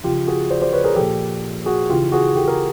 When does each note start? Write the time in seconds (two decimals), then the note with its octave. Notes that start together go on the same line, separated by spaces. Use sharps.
0.03 C#3 F3 F4 G4
0.27 F#4 G#4
0.50 C5 D5
0.62 C5 D5
0.73 B4 C#5
0.84 G#4 A#4
0.96 A#2 F3 G4 A4
1.66 F#4 G#4
1.89 C#3 F4 G4
1.93 E3
2.12 F#4 G#4
2.36 G4 A4
2.48 G#4 A#4